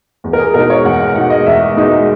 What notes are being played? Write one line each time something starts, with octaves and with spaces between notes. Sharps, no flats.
E2
A#4
G#4
B2 G#3 D#4 A#4
C#5
E2 F#5
F#5
B2 G#3 D#4 F#5
D#5
E2 E5
B2 G#3 D#4